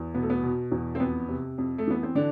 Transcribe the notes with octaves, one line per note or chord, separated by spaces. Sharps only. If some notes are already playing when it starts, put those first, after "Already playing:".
Already playing: E2
B2 B3
A3
B3
B2
E2
C4
F2 B3
C3
F2
A3
E3 B3
C4
D3 D4